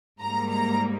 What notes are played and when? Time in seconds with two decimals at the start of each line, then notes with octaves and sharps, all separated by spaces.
0.20 G#2 G3 A#3 A#5
0.50 A#5